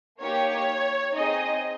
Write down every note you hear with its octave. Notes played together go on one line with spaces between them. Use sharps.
A#3 D#4 G4 C#5
C4 D#4 G#4 D#5